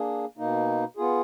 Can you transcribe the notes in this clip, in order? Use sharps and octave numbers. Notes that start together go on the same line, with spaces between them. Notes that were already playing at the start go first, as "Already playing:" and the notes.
Already playing: A#3 D4 G#4
B2 A#3 D#4
B3 F4 G#4